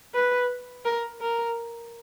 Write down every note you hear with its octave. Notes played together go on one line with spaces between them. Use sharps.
B4
A#4
A#4